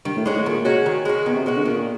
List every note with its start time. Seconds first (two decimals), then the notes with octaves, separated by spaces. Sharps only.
0.05 G2 D#3
0.16 A2
0.26 G#2 G#3 C#4 F#4
0.36 A2
0.46 A#2 D#3
0.65 G#3 C#4 F#4
0.86 D#3
1.05 G#3 C#4 F#4
1.26 B2 D#3
1.35 C3
1.46 B2 G#3 C#4 F#4
1.56 D3
1.65 A#2 D#3